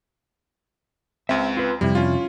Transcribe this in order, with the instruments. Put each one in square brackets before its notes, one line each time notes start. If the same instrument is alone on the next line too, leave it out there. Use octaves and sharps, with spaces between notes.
[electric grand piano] C#2 C4 [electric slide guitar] E5
[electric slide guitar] F4 B4
[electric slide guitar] F2 C3 E4 [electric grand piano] G3
[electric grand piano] C#4 F4